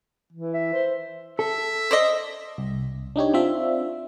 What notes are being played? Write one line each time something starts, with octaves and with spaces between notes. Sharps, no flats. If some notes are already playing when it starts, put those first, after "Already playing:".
E3
E5
C5
A4 E5
C5 D5 D#5
C2
D4 D#4 G4 C#5
C4 D4 F4 E5